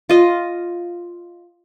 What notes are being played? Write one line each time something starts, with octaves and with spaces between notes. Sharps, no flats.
F4 D#5